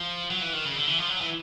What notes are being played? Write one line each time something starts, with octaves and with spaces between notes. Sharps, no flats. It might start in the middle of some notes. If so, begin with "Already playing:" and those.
Already playing: F3
F#3
E3
D#3
C#3
D3
E3
F3
F#3
E3